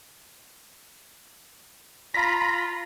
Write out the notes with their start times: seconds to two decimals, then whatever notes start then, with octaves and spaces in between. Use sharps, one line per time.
2.14 F4 A#5 B5